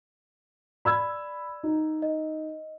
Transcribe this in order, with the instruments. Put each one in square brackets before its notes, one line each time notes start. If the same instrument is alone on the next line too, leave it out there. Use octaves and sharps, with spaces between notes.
[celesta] D5 [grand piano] B5 E6 G#6
[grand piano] D#4
[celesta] D#5